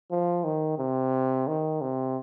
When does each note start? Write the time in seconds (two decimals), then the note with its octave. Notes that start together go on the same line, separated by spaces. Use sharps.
0.11 F3
0.44 D#3
0.78 C3
1.47 D#3
1.81 C3